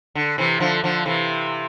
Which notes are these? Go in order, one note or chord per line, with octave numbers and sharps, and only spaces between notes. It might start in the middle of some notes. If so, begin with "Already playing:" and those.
D3
C3 E3
D3 F3
D3 F3
C3 E3